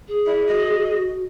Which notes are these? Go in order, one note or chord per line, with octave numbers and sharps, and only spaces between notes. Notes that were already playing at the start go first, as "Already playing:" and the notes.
G#4
E4 D5
F#4 D#5